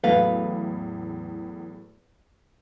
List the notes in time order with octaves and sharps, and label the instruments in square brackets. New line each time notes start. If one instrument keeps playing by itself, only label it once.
[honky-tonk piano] E2 A2 [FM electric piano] F#3 A3 [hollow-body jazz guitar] A4 B4 F5